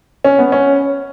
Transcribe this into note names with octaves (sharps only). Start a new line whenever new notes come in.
C#4
B3
C#4